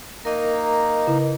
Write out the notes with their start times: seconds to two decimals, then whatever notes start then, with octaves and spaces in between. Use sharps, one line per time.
0.25 A#3 D#4 A#4 D#5
1.07 C#3 E4